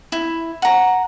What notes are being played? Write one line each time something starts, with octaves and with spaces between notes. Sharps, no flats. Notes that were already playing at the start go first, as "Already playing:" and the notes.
E4
F#5 A#5